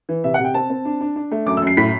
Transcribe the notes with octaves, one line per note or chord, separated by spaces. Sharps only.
E3
C3 E5
F#5
C3
G5
C4 A5
C4
D4
D4
D4
A3
F#2 D6
E6
F#2 C7
A2 B6